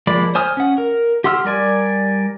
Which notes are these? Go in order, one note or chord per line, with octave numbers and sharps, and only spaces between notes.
F3 G#3 A#3 D5 B5
C5 G#5 D#6 F6
C#4 F#5
A#4
G4 F#5 C6 E6 F6
G3 A#4 D5 G#5